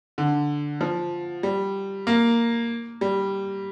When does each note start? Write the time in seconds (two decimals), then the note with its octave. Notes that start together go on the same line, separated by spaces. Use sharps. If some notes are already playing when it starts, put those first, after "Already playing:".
0.18 D3
0.81 F3
1.43 G3
2.07 A#3
3.01 G3